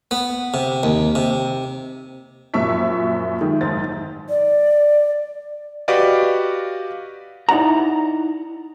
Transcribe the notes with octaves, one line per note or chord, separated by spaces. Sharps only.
B3
C3
D#2
C3
F#2 A#2 F3 E5 C#6 B6
D#3 G#3
F#1 G#2 D#3 C5 A6
D5
F#4 G4 B4 D5 D#5 F5
D#4 E4 D5 F#5 A#5